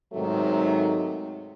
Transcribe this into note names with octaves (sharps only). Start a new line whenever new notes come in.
G#2 C3 D#3 F#3 A3